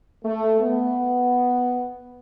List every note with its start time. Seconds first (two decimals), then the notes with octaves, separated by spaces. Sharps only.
0.24 A3
0.61 B3